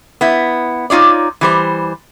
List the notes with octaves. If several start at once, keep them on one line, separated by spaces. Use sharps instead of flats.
B3 E4
D#4 F4 C#5 D5
E3 G3 C5